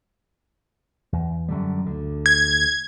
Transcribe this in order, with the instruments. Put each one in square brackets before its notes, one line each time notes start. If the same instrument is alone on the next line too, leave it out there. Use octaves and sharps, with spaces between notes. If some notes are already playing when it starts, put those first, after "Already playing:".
[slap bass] E2
F#2 D3 G3
D2 D3
[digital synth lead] G#6